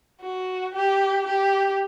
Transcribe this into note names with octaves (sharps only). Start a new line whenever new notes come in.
F#4
G4
G4